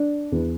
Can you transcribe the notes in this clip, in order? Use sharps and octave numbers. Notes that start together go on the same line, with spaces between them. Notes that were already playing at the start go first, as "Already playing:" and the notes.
Already playing: D4
E2